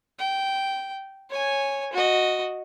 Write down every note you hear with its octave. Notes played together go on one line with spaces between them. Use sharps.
G5
C#5 G#5
F#4 D#5